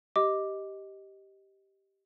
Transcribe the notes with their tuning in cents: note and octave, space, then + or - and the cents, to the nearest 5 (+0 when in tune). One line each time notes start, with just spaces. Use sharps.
G4 -10 D#5 +5 D6 +0